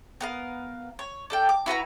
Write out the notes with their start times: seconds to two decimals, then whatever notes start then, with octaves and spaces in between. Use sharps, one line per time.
0.21 B3 A#4 F5
0.99 C#5
1.30 D4 A4 G5
1.49 D6
1.66 E4 F#4 B4 A#5